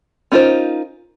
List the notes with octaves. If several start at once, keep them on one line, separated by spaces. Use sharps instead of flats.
C#4 D#4 F4 A#4 C5